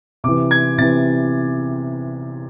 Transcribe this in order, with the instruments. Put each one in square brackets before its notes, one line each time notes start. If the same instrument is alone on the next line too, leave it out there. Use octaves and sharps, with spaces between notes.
[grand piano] C3 E3 D6
G#6
C3 E3 A6